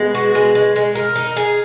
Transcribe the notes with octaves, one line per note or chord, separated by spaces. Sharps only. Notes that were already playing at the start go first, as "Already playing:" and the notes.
Already playing: G#3 B3
F#4
G#3
G#3
G#3
A#4
D#4
G#4